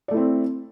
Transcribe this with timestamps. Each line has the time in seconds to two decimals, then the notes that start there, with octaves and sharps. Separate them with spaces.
0.08 D5
0.11 A3
0.14 E4
0.17 C4